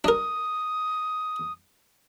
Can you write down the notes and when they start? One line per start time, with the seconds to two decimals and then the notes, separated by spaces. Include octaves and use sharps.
0.04 D4 A#4 D#6